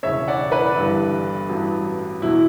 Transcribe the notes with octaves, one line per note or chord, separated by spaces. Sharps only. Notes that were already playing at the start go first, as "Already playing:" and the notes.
E1 E2 C#3 C#5 E5
D5 F#5
B4 D5
G1 G2 E3 G3
A1 G2 F#3
E2 B2 F#3 E4